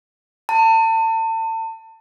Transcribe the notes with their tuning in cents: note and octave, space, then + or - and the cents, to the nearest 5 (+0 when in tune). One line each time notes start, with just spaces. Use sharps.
A5 +35